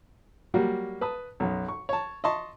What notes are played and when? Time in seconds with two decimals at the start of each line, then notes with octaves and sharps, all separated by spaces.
0.54 F#3 G3 A#3 F#4
1.01 B4 A5 D#6
1.40 B1 F#2
1.68 C#6
1.89 C#5 A5
2.24 D#5 E5 A5 C6 C#6